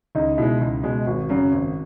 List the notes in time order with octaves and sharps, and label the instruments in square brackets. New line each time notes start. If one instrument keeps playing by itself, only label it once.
[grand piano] C#2 [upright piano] D#4
[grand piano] B2 G#3 [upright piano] E4
[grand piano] C#2
B2 G#3
[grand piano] G#1 [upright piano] F#4
[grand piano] F#2 C#3 F#3
G#1